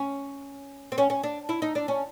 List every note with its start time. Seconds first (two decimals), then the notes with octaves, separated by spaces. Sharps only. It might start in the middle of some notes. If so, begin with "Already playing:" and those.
Already playing: C#4
0.92 C4
0.98 C#4
1.10 C#4
1.23 D4
1.49 E4
1.62 D#4
1.75 D4
1.88 C#4